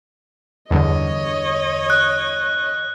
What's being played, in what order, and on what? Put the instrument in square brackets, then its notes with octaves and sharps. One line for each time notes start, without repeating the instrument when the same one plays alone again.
[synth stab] E2 G2 D3 [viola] C#5 D#5
[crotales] F#6